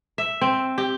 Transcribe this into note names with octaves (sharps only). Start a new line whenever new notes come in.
E5
C4
G4